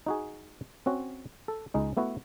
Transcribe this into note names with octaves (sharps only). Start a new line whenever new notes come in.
D#4 F#4 G#4
C4 C#4 F#4
A4
C#2 G#3 D#4
A3 B3 E4 F#4